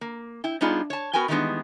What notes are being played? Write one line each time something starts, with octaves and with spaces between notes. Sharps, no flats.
A#3
E4 G5
G3 B3 D4 D#4 F4 G#4
C#5 A5
B3 F#4 A#4 B4 G5 G#5
D#3 E3 G3 G#3 B3 D4